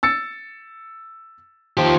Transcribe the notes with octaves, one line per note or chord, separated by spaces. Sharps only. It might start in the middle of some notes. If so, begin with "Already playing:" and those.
E6 A6 C#7
D#3 F3 G4